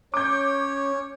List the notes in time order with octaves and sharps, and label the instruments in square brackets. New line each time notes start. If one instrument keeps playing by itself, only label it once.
[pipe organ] C#4 [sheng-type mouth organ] C#5 [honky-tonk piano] D6 G6